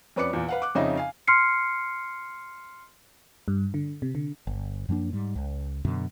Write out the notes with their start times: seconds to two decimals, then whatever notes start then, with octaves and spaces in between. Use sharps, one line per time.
0.16 F2 C#4 B4 D5 D6 C#7
0.33 E2 A#2
0.48 B4 F5 F#5
0.62 D6 F#6
0.75 F2 C#3 C#4 D#4 D#5 E5
0.97 F5 G#5
1.27 C6 F6 C7 C#7
3.48 G2
3.74 D3
4.02 C3
4.15 D3
4.47 G1
4.89 F#2 F3 A#3 D4
5.13 G#2 G3
5.36 C#2
5.85 F#2 B2 D3